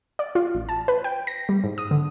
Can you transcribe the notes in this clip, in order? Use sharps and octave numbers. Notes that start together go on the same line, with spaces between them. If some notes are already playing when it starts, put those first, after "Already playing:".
D5
F4
A1
A5
B4
G5
A#6
G3
G#2
D#6
D3